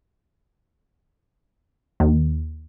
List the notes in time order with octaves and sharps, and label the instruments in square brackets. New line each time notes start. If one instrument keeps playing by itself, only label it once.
[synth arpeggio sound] D#2